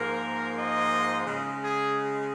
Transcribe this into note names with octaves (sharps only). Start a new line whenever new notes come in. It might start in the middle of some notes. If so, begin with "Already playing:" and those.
Already playing: G#2 F3 A#3 A#4
D#5
C#3 G#3
G#4